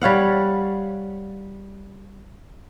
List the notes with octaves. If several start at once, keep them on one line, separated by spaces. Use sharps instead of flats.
G3 C#5 F5 F#5